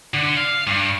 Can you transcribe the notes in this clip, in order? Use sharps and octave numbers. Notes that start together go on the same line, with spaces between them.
D3
F5
G2